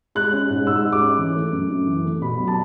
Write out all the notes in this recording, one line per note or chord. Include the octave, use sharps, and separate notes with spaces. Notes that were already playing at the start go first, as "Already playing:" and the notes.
G#3 F#6
C#4
G#2
G#2 E6
G#3
D6
C#4
E3
A3
F#2
F#2
E3
A3
B2 B5
F#3
A5